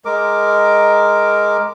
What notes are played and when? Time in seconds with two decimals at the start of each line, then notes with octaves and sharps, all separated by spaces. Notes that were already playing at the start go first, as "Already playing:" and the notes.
0.05 G#3 A#4 D6